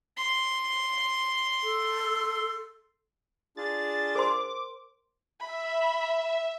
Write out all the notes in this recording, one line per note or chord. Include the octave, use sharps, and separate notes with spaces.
C6
A4
D4 F4 G#4 A6
A#4 C5 C6 D6
E5 B5